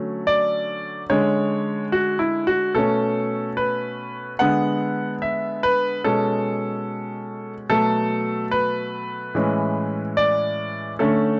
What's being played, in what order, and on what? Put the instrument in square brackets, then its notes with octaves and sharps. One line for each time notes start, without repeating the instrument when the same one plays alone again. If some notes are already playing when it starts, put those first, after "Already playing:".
Already playing: [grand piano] D3 F#3 A3 C#4
D5
D3 G#3 C#4 C#5
F#4
E4
F#4
B2 A3 C#4 A4
B4
D3 G#3 B3 F#5
E5
B4
B2 G#3 C#4 A4
B2 F#3 A3 A4
B4
A2 E3 G#3 C#4
D5
D3 A3 C#4 A4